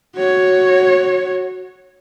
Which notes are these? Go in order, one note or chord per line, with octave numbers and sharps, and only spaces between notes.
F#4 C#5